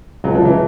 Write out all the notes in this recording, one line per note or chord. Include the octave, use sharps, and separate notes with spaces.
C#2 F#3
F3
C#2 E3